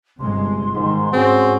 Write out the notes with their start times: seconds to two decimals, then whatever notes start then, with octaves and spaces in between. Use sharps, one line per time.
0.20 G1 C3 G#3 C6
0.74 G#2 D#3
1.13 G#2 C4 C#4 F#4 G#4